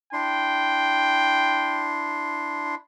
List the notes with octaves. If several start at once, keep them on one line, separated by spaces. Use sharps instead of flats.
D4 E4 G5 C6